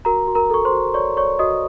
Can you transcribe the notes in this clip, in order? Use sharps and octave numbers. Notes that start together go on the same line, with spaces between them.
F#4 A#4 A#5
F#4
A#4 A#5
A4 C#6
C5 C6
F#4
C#5 D5 C#6
C#5 D5 C#6
F#4 D#5 D#6